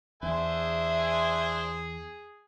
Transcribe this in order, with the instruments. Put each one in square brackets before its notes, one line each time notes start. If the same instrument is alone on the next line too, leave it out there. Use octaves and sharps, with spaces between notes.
[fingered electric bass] E2 [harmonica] D4 C5 G#5 [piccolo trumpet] G#4 [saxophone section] E5